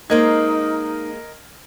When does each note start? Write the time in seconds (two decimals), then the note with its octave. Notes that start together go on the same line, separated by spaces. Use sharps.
0.10 G#3 A#3 D#4 A#4 C5 D#5 G#6